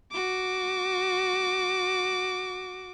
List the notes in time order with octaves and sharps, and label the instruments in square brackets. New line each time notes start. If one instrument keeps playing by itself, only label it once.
[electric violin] F#4 D6